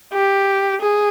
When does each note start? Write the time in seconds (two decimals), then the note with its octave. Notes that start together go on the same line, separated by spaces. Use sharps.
0.13 G4
0.81 G#4